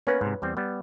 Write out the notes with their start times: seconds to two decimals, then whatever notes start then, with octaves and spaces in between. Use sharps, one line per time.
0.07 A#3 B3 C#4 B4 C#5
0.21 G#2 C3
0.42 E2 G3 C4
0.57 G3 B3